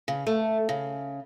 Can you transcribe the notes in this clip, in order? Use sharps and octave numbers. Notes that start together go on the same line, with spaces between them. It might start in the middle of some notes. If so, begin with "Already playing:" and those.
C#3
A3
C#3